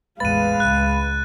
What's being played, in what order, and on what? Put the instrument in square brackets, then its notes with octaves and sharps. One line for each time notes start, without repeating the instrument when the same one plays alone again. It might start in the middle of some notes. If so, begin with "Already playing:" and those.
[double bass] A1 E2 [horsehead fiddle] G#3 F5 [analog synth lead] B4 [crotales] A6 D#7
[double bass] C#2 [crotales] F#6